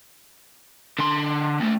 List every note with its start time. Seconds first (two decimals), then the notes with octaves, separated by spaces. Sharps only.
0.99 D3 C6
1.60 D#2 A3